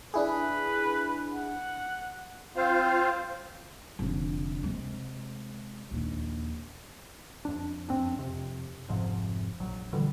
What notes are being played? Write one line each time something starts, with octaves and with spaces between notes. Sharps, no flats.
D4 E4 G#4 B4
F#5
C4 F4 C5 F5
F1 D3
C3 G#3
A#1 D#2
F2 D4
F2 C4 D4
F2 C3
F1 F2 G#2 C3
A#1 F#3
A#2 D3 E3 G3